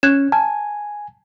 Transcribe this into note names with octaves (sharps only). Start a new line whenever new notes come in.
C#4 F#6 G#6 E7
G#5 A5